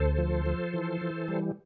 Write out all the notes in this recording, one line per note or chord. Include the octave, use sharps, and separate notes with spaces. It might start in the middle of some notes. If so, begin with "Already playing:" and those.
Already playing: D2 A4 C5
F3
F3
E3
E3
G3